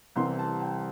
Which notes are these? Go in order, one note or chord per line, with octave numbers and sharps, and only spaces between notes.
C2 C3 E3 G3 C6
A5
G5